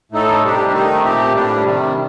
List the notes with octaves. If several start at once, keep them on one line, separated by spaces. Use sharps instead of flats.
A2 A3 D#4 A4
C3 G3 D4 G4
D#3 A3 D#4
A#2 A3 C4 G4
A2 G3 D4
C3 D#3 G3